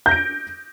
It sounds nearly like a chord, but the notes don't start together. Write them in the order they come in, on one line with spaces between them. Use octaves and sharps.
G6 A#6 D7